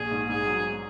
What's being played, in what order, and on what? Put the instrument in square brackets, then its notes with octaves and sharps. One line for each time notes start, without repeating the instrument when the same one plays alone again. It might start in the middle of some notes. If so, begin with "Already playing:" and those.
Already playing: [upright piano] A#1 [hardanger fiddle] G#4
[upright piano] G#2
[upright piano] G#2 [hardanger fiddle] G#4
[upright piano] F#3